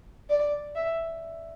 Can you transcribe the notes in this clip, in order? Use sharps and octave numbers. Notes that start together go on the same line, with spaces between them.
D5
E5